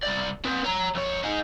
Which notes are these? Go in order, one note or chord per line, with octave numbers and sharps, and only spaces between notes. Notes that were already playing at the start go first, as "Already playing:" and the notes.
C2 D5
C4 B4
C#5 A#5
F2 C#5
D#4 G#4